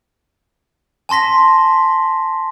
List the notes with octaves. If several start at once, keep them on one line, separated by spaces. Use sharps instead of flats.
G#5 A5 C6 A#6 B6